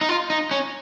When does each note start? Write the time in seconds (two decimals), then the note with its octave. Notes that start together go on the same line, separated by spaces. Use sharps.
0.01 D#4
0.09 F4
0.30 D#4
0.51 C#4